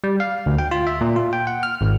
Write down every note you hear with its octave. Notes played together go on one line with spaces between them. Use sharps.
G3
F5
D2
G5
F4
E5
A#2
F4
G5
F#5
F6
G#1